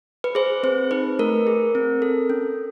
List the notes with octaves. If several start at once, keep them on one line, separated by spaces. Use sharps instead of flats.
B4
G#4 C5
C4 C5
D#4 B4
A3 A#4
G#4
C4
A4
C#4